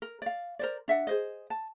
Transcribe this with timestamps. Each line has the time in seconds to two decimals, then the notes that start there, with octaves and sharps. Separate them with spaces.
0.02 A#4
0.22 D5 F5
0.59 A#4 C5 D5
0.88 D4 E5 F#5
1.07 G#4 C5 D#5
1.50 A5